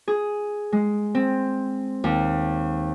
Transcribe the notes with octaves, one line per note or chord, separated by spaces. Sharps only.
G#4
G#3
C4
D#2